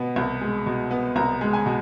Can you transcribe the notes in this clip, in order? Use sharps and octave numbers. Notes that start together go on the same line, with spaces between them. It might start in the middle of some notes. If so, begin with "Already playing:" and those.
Already playing: B2 B3
C2
G#3
B2
B3
C2 A#5
G#3
G#5
B2